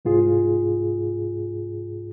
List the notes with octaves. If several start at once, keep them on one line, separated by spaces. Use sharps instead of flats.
C2 G#2 F4 G#4